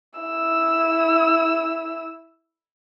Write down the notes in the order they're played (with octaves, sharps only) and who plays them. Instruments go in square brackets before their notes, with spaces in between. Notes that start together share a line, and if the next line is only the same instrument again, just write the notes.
[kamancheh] E4 E6